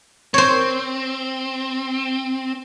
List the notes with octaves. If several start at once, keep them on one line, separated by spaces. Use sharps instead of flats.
C4 C5 C#5